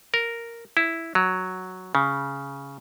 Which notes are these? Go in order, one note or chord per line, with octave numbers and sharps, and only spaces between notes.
A#4
E4
F#3
C#3